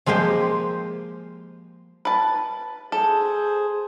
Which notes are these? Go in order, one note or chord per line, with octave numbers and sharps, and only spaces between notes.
F3 G#3 A#3 G4 C5
B4 A5
G#4 A4 C5